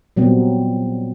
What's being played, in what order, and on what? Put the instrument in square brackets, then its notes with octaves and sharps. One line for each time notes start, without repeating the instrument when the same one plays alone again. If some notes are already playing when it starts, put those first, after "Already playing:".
[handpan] A#2 F#3 G3 B3 C4